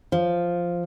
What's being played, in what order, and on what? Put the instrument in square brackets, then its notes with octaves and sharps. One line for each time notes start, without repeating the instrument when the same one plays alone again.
[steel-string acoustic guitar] F3